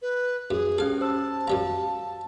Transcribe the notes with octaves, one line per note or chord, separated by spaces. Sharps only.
B4
F#2 G#4
C#4 G4 A4 F5
C5 A5 E6
F#2 G3 F5 A#5